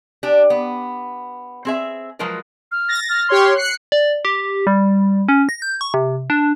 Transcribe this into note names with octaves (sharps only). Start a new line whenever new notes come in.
D4 G4
B3
C4 G#4 E5
F3 F#3 G#3 A#4 B4
F6
A6 A#6
F6
G4 C#5 C6
F#6 C7 C#7
D5
G4
G3
C#4
A#6
G6
C#6
C3
D4